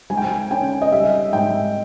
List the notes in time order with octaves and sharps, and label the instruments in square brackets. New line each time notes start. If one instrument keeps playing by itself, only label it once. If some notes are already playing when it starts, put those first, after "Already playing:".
[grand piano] G#3 [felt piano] G#5
[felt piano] G5
G#5
[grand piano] C#4 [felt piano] G5
[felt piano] D#5
[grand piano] G3 [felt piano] E5
[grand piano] G#2 [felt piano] G5